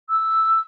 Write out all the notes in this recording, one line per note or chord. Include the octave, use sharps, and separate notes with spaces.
E6